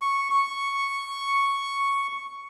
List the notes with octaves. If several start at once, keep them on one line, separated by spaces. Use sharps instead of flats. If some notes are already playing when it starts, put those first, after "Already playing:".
C#6
C#6